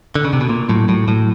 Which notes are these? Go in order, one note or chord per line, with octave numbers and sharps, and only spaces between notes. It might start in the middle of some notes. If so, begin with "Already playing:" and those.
D3
C#3
C3
B2
A#2 A#3
A2 F#3
A2 F#3
A2 F#3